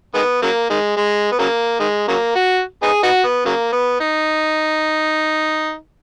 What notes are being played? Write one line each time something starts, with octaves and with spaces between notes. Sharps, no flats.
D#3 G#3 B3
C#3 F#3 A#3
D#3 G#3
G#3
B3
C#3 F#3 A#3
D#3 G#3
C#3 F#3 A#3
F#4
B3 D#4 G#4
B3 D#4 F#4
B3
C#3 F#3 A#3
B3
D#4